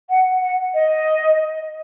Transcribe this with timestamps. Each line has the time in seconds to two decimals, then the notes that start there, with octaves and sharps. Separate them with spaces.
0.10 F#5
0.42 F#5
0.74 D#5